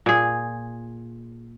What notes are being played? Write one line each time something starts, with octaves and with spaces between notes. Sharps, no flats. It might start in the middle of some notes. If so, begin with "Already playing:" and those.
A#2 G#4